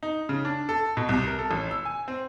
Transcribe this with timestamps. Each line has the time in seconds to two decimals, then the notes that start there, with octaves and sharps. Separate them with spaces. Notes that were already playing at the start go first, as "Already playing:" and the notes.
0.03 D#4
0.29 C#3
0.45 D4
0.69 A4
0.97 B2
1.09 C2
1.27 A#4
1.39 A4
1.51 A1
1.71 E6
1.85 G#5
2.08 C4